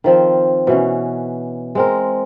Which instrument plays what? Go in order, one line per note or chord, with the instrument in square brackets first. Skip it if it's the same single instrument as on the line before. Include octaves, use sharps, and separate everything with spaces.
[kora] D#3 F3 C4
B2 E3 C#4
G#3 C4 A#4